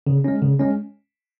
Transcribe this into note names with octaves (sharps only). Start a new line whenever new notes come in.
C#3
G#3 C#4
C#3
G#3 C#4